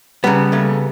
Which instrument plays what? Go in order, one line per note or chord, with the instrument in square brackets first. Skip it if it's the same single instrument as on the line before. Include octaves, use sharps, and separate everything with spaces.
[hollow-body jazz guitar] C#3 B3 [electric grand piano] G3 [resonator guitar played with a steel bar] F#5 A5 A#5
[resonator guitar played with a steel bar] A3 A#3